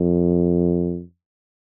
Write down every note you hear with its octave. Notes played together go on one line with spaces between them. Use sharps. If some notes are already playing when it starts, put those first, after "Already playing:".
Already playing: F2